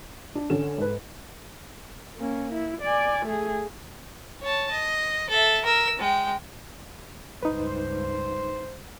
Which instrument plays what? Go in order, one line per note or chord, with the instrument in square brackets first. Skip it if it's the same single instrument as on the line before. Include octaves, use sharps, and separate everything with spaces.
[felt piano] D4
[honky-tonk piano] D3 C#4 E7 [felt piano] A4
[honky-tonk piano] G#2 B4
[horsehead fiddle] A#3 C#4
E4
D5 G#5
A3 G#4
[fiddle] C#5 A5
D#5
A4 E5
A#4 E6
G#3 G5
[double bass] C#2 G2 [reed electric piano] D#4 B4 [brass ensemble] C5